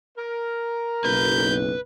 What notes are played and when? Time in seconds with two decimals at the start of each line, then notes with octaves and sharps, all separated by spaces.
0.17 A#4
1.05 F#1 B1 B4 G6